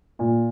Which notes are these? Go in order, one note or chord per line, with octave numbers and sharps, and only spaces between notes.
A#2